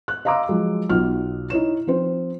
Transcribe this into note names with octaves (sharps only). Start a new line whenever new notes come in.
F#6
D#5 F5 A#5 C6 D6 E6
F3 F#3 G#3
B1 B2 F4 F6
D#4 E4 C#5 E7
F3 C4 C5